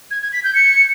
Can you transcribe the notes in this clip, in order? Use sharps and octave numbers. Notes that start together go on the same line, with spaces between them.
G#6
G#6
B6
G6
C#7